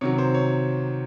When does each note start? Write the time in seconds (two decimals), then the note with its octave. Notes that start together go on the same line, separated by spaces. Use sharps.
0.01 C3 D#3 F#3 C#5
0.18 C5
0.34 C#5